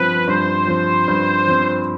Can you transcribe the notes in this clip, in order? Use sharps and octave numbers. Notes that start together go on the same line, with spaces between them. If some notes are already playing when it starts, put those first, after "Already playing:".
Already playing: G2 F3 C4 B4
G2 C5
F3 C4
G2
F3 C4